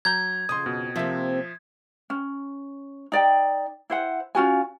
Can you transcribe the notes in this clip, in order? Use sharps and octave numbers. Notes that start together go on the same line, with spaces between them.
F#3 A#5 G6 G#6
F2 C#3 C6 D#6
B2
C3 F3 A#3 E5
C#4
D#4 D5 G5
E4 C5 F#5
C#4 F4 F#4 G#5